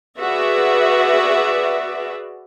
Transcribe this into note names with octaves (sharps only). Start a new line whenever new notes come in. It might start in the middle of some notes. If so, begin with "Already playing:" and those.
F#4 G#4 B4 D5 E5